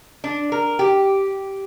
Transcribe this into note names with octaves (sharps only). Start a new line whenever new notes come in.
D4
A#4
G4